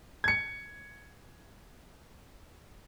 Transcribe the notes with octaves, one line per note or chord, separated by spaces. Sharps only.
G#6 C#7